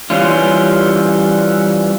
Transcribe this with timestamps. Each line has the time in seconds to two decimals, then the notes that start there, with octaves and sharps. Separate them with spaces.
0.10 E3 G3 C#4 F4